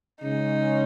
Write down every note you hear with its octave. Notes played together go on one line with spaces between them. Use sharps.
C#3 G#3 C#4 D#4